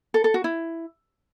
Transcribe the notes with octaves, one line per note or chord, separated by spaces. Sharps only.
A4
A4
F#4
E4